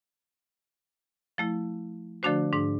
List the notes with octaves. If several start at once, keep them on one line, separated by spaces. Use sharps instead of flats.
F3 A3 E4
D3 F3 A3 D4 F#4 C5
G#2 D4